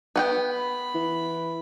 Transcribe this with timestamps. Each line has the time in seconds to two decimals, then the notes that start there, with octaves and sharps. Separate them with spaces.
0.16 B3 F#5 G5
0.52 B5
0.95 E3